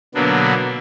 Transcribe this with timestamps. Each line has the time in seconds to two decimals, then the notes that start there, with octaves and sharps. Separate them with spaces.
0.15 B2 D3 F#3 A#3 B3 D4